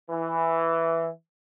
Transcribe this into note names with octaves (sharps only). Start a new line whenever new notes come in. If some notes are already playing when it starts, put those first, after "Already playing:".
E3